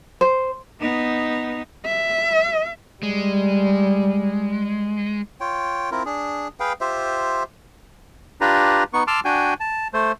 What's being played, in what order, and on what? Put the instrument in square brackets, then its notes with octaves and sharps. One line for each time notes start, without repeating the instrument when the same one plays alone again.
[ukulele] C5
[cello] B3 D#4
[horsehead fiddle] E5
[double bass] G3 [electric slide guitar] G#3
[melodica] F4 C#5 G5
C4 E4 F4 A#4
D4 G#4
G#4 B4 F5 G5
F4 G4 C5 E5
[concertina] D4 F4 G4 B4 A#5
B3 D#4 C#6
A5 C6 D6 E6 F6
D4 F#4 G5 G#5
A5
A3 C5